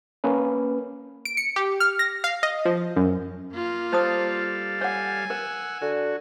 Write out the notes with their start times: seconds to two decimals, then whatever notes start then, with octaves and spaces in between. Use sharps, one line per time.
0.24 A#3 C#4 B4
1.25 D7
1.37 C#7
1.56 G4
1.80 F6
1.99 A#6
2.24 F5
2.43 D#5
2.65 F3
2.96 F#2
3.53 A#3 F4
3.92 G3 A4 C5 F5 A5 D#6
4.81 C#5 F#5 G#5
5.30 A#4 F#5 E6
5.82 D3 F#4